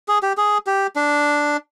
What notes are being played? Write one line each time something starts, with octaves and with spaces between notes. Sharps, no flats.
G#4
G4
G#4
G4
D4